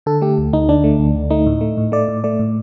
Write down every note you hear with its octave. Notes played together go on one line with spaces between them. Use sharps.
D3 A4
A3 G4
D2
D2 D#4
D3 D4
A3
D2
D2
A3 D#4
A2
A3
A2
A3 D5
A2
A3 D5
A2